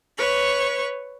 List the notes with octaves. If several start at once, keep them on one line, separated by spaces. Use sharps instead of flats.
B4 C#5 C#6